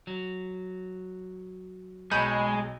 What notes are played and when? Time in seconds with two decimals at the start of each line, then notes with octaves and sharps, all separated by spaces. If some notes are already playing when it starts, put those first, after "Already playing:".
0.07 F#3
2.11 B1 G#3 G#5 B5 C#6 G6